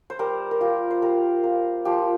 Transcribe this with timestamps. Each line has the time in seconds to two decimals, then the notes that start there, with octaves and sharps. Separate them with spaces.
0.10 C5
0.19 G3 A#4
0.51 A#4
0.61 F4 G4
0.91 C5
1.02 G3 A#4
1.44 A#3
1.85 F3 G4